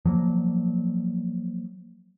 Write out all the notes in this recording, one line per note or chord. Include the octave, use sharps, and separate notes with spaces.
F3 F#3 A#3